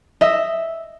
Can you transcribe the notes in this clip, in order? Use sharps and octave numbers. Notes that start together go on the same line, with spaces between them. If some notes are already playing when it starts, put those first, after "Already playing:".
D#5 E5